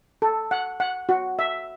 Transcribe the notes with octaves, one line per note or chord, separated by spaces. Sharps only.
A4
F#5
F#5
F#4
E5